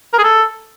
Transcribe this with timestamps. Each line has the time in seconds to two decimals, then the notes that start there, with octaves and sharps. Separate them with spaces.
0.13 A#4
0.19 G#4
0.24 A4